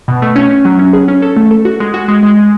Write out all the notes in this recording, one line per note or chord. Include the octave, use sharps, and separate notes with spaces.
B2
A3
C#4
C#4
F#3
C#4
G#4
C#4
A4
A3
A4
F#4
G#3
F#4
G#3
G#3
G#3